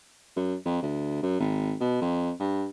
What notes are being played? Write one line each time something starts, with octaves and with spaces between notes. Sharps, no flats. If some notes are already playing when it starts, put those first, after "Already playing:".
F#2
F2
D2
F#2
G#1
B2
F2
G2